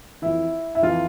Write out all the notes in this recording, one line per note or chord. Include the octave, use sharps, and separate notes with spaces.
F2 E3 E4
E4
F2 E3 F4